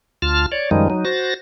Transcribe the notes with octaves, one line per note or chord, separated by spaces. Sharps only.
D2 F4 A5 F6
C#5 D5
F#2 D#3 F3 G3 G#3 D#4
F#3 D#4
F#4 C5 A6 A#6